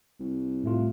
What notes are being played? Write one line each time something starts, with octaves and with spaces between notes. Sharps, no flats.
C2
A2 A3 F4